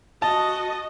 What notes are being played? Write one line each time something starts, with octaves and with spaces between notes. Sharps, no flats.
F#4 D#5 A5